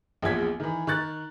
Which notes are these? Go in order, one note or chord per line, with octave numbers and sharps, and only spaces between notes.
A#1 E2 F3 G#6 B6
D#3 E3
D#3 C#6 F#6 A6